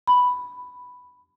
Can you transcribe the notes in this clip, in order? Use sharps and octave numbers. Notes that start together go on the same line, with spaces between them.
B5